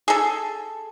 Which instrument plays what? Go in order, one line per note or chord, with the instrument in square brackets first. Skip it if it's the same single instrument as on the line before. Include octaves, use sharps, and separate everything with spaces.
[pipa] G#4 A4